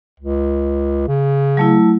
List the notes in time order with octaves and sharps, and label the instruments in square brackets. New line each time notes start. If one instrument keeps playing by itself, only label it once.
[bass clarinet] C#2
C#3
[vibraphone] F#3 A3 E4